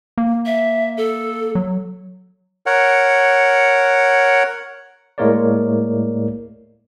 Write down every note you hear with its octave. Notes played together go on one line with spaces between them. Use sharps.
A#3
E5
A4
F#3
A#4 C#5 F#5
A2 G#3 A#3 A#4 C#5 D5